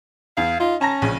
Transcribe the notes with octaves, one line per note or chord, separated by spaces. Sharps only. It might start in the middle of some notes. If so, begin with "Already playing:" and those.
E2 F5
D#4 F4
C#4 A5 A#5 A#6
A#1 C#3